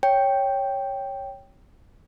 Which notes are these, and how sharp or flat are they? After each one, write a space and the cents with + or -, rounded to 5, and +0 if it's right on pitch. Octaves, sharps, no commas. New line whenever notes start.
C#5 +0 G5 +0